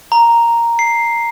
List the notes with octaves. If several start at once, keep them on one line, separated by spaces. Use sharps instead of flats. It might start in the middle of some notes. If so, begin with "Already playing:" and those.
A#5
C7